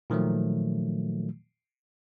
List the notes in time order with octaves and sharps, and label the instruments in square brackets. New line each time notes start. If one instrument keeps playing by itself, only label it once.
[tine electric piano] A#2 D#3 F3 F#3 A3